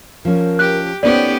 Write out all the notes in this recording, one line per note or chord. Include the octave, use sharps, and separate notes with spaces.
F3 C#4 A#4
G4 F#6
A3 B3 C#4 D#4 G4 C5 D5